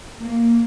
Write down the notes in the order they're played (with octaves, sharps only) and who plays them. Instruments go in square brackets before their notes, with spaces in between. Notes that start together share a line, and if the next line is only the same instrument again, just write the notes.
[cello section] A#3